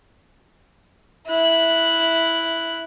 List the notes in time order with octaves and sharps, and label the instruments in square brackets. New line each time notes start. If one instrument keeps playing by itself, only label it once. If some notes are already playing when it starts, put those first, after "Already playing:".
[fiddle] E4 F#6